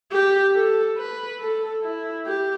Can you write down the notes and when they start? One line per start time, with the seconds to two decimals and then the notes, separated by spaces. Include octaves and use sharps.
0.12 G4
0.55 A4
0.97 B4
1.40 A4
1.83 E4
2.26 G4